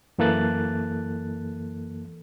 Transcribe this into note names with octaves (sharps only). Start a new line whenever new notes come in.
F#2 E3 A#3 A4 F#6 A6